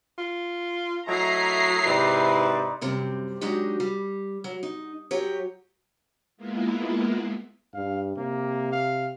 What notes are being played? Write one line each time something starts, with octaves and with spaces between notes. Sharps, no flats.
F4
F#3 A3 E4 D#5 A#5 C7
G#2 C3 D#4 E4 B4 C5 D5
F#2 C3 G3 C4
F#3 G#3 D4 D#4 F#4 G4
G3
F#3
D#4
F#3 G4 C#5
G#3 A#3 B3 E4 F4
G2 F5
C3 A#3
F5